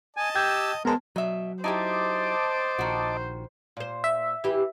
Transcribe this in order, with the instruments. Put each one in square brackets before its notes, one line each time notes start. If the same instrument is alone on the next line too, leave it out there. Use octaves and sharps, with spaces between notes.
[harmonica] D#5 A5 [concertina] G#5
[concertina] G4 E6 [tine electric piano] G5 G6 G#6
[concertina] G#3 A#4 [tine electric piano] B3 A5 [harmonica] C5
[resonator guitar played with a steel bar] B2 E5 [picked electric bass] F#3
[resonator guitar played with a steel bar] D#4 E4 G4 [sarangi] C5 [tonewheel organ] D#5 A5 D6
[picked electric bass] A#1 [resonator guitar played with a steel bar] D#3 F#4
[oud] A#2 C5
[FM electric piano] E5
[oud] E3 G4